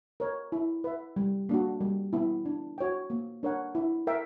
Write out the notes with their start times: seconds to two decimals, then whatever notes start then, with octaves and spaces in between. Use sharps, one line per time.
0.20 A#4 C#5
0.52 E4
0.84 B4 E5
1.16 G3
1.49 A#3 D4 F#4
1.81 G3
2.13 B3 E4
2.46 D4
2.78 F#4 C#5 G5
3.10 A#3
3.43 D4 A#4 C#5 F#5
3.75 E4
4.07 A#4 E5 G5